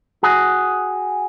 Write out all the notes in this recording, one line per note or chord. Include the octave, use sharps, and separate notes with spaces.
F#4 G#4